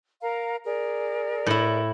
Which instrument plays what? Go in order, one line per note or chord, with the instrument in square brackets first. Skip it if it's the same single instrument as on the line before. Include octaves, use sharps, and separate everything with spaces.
[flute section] A#4 F5 A#5
G#4 A#4 D5
[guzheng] A2 E4